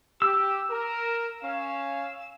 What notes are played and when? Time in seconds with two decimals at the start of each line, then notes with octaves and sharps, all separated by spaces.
0.22 G4 E6
0.70 A#4
1.43 C#4 F5